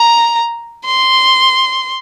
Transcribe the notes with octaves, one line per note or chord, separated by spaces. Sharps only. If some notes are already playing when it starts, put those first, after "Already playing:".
Already playing: A#5
C6